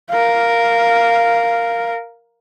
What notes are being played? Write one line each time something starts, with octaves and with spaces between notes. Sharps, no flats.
A#4 F5